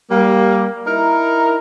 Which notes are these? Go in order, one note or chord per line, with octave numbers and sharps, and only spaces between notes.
G3 A#3
D#4 E4 A#4